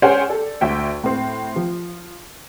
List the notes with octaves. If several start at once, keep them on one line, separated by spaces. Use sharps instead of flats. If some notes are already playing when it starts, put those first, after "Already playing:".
C#4 G#4 C5 F#5 G5
A4 D5
D2 E5 G5
A2 C4
F3